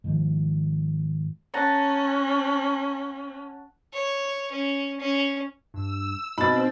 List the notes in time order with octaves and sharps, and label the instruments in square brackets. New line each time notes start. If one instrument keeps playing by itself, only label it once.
[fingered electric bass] G#2 D#3 F3
[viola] C#4 [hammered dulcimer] F#5 A5 A#5
[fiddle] C#5
C#4
C#4
[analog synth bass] G2 [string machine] E6
[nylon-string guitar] B2 [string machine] C4 [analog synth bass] D#4 [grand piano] B5 A6